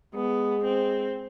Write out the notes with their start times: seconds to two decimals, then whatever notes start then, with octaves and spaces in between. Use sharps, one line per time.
0.14 G#3 B3
0.63 C4